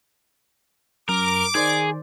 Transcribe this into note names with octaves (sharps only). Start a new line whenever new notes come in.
F#2 A#4 D6
D#3 G#4 C5 D5